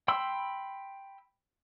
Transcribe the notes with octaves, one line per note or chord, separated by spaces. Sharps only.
G5 B5 C6 E6